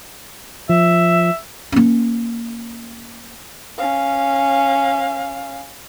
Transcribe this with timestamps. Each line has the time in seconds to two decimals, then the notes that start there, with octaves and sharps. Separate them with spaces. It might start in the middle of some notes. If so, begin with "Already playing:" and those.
0.69 F3 E5
1.72 A#3 C#4
3.78 C#4 F5